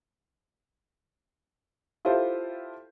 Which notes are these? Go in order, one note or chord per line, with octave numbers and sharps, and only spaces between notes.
E4 F4 G4 A4 C5